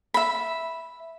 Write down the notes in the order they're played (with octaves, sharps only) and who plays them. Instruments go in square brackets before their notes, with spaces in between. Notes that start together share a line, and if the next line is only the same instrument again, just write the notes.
[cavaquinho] E5 B5